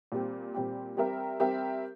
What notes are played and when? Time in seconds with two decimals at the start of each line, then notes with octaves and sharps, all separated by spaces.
0.12 A#2 G3 C4 G4
0.54 A#2 G3 C4 G4
0.97 G3 C4 G4 A#4 E5
1.40 G3 C4 G4 A#4 E5